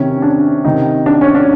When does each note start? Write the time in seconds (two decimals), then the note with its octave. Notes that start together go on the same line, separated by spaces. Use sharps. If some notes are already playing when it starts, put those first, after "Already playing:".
Already playing: C3 D#3 C#4
0.22 D4
0.64 C3 D#3 D#4
1.06 D4
1.21 C#4
1.35 D4